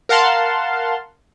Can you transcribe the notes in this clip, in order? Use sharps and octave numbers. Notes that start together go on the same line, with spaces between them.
A#4 F5 F#5 A5 C6